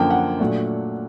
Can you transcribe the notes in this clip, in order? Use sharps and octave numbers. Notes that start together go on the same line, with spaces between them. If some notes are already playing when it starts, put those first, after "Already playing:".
Already playing: F#2 D3 F3 A#3 G5
F#5
A#2 F#3 A3 D4